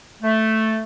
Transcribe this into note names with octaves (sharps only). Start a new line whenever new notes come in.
A3